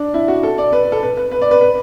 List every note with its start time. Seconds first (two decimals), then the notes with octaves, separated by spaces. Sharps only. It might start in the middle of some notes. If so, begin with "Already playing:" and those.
Already playing: D4
0.14 E4
0.28 F#4
0.43 A4
0.58 D5
0.73 B4
0.92 A4
1.03 B4
1.17 B4
1.31 B4
1.41 D5
1.51 B4
1.61 B4